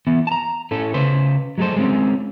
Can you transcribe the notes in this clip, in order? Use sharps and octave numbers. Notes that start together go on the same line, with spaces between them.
E3 B3
A5 A#5
A2 A3 C#4 A4
C#3 B4 C5
F#3 G#3 A3 A4 C5
G#3 C4 C#4